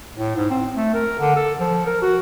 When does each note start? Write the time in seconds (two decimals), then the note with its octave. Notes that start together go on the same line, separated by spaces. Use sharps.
0.18 A2
0.36 G#2
0.50 C4
0.76 A3
0.94 A#4
1.20 D3
1.36 A4
1.60 F3
1.86 A#4
2.02 F#4